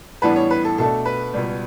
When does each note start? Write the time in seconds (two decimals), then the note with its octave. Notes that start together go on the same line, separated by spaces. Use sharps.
0.22 A2 E3 G3 B3 D4 B4
0.36 C#5
0.51 B4
0.65 A4
0.78 B2 A3 D4 A4
1.05 B4
1.34 C#2 B2 G3